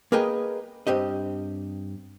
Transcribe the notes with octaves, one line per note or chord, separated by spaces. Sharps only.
A#3 G#4 A#4 B4 D#5 G5
G2 C4 G4 D#5